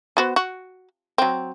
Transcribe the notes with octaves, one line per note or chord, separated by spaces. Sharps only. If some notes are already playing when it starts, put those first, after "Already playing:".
B3 F#4 C5
F#4
F#3 C4